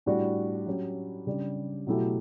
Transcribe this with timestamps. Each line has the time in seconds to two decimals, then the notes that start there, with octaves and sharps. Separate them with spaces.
0.06 A2 G3 D4 F#4
0.66 F#3 C#4 G4
1.27 C#3 G3 D4 G4
1.87 B2 F#3 A3 E4 G4